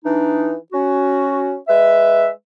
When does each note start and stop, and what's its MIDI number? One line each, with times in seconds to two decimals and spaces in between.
0.05 0.54 52
0.05 0.54 62
0.05 0.54 63
0.73 1.55 61
0.73 1.55 66
1.69 2.29 56
1.69 2.29 71
1.69 2.29 76